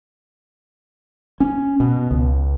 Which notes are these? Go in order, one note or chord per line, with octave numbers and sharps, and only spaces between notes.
C#4
B2
C#2